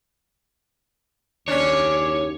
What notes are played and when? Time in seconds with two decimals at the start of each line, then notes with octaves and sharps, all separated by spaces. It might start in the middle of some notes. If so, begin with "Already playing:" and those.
1.48 F#1 D#2 C#4 D4 C#5 D6